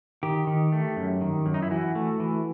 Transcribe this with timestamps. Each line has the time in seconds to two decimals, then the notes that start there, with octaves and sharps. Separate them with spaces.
0.23 D#3 G4
0.47 D#3
0.72 A3
0.96 F#2
1.21 D#3
1.46 F#2
1.54 D#4
1.62 E4
1.71 E3 F#4
1.95 A3
2.20 E3